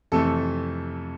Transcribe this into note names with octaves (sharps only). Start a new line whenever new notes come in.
F2 C3 E3 A3 A4